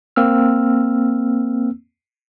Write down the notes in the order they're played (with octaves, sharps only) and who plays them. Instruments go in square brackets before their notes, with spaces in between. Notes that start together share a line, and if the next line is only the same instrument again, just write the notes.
[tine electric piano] A#3 C4 E6 F6